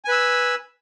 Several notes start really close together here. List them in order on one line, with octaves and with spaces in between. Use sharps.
G#5 B4 E6